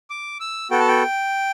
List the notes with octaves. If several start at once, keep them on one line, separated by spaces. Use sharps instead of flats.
D6
E6
B3 F#4 A4 G5
A5
G5